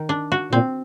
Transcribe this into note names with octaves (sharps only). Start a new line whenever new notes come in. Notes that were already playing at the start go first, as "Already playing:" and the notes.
Already playing: D#3
D4
F#4
A#2 C4